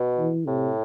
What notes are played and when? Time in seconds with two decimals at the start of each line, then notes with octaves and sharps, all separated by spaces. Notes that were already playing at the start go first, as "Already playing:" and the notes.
Already playing: B2
0.18 E3
0.47 A2 C3